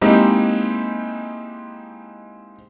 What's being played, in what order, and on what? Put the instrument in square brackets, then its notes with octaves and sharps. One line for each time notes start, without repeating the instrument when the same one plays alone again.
[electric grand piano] G#3 A#3 C4 D#4 E4 G4